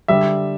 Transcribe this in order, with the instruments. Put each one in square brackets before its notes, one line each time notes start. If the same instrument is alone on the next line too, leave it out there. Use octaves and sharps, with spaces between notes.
[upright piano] D3 G3 E5